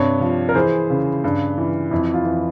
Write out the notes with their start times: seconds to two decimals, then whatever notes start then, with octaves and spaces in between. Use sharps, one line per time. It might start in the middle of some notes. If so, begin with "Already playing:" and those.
Already playing: G2 C3 C#5
0.21 F3
0.49 A#4
0.55 E3 G#4 C5
0.90 C#3
1.24 G2
1.58 E3
1.91 F2 E4
2.14 F4
2.25 E3